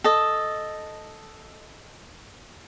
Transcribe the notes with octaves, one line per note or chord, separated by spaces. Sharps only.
A4 D#5